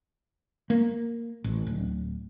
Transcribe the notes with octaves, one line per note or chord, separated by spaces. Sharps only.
A#3
A1
D1